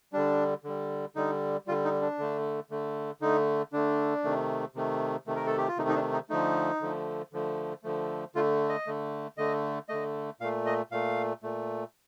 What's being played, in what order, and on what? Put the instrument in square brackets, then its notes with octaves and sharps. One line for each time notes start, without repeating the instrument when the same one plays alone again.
[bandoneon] D3 G3 D4
D3 G3
D3 G3 D#4
D3 G3 F4
D#4
D4
D3 A3
D3 A3
D3 A3 D#4
D3 A3 D4
C3 D#3 A3
C3 D#3 A3
C3 D#3 A3
A#4
A4
G4
F4
C3 D#3 A3 D#4
D#4
D4
D#4
D3 F3 A3 D#4
D3 F3 A3
D3 F3 A3
D3 F3 A3
D3 A3 F4
D#5
D3 A3
D3 A3 D#5
D3 A3 D#5
A#2 F5
A3
D#5
A#2 A3 F5
A#2 A3